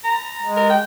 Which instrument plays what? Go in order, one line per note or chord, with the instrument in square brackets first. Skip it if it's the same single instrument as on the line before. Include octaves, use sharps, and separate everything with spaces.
[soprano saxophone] A#5
[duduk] G#3
[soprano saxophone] A#4
G5